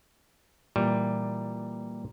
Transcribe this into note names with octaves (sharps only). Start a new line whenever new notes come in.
A#2 E3 G3